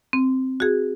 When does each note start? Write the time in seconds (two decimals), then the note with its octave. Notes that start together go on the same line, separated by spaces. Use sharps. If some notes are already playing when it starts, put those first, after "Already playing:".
0.13 C4
0.60 F#4 G#4